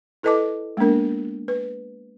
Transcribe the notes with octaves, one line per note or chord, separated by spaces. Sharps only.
E4 A4 B4 D#5 A5 D6
G#3 A#3 B3 D4 A#4
B4